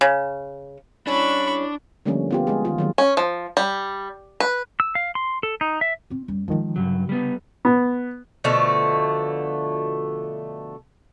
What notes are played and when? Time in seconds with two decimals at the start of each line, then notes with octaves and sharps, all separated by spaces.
0.01 C#3
1.07 G3 C#4 D4 E4 B5 C#6
2.05 D3 F3 G3 A3 A#3 C#4
2.31 B3 F4 G4
2.47 G#3 G#4
2.65 D#3 F4
2.78 D#3 F#3 A#3
2.98 C#4
3.17 F3
3.57 G3
4.40 B4
4.80 E6
4.95 F5
5.15 C6
5.43 A4
5.61 D#4
5.81 E5
6.10 C4 F4
6.28 F#2 G3
6.48 D#3 F3 G#3 F4
6.76 G2 C#3 F#3 F4
7.09 G3 B3
7.65 B3
8.44 B2 D3 F3 A3